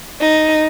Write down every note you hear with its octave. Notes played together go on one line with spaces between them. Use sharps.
D#4